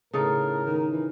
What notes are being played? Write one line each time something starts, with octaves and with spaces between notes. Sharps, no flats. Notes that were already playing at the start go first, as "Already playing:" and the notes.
A2 C#3 D#4 A4 A#4
D#3
E3